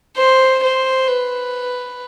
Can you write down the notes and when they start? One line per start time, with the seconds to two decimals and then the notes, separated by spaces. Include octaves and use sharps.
0.17 C5
0.63 C5
1.08 B4